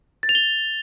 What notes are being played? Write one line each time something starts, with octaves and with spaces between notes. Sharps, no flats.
A6
F7
G7